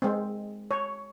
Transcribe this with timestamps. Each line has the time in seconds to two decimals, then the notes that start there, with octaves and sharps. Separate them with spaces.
0.02 G#3 C4
0.71 C#5